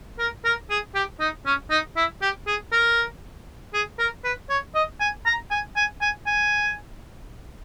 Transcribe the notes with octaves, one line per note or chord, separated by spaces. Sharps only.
A#4
A#4
G#4
G4
D#4
C#4
D#4
E4
G4
G#4
A#4
G#4
A#4
B4
C#5
D#5
G#5
A#5
G#5
G#5
G#5
G#5